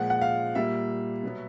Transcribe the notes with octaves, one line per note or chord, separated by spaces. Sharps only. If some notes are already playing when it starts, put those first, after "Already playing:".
Already playing: A#2 F3 G#3 F#5
F#5
F5
A#2 G3 A#3 E5
B2 F#3 B3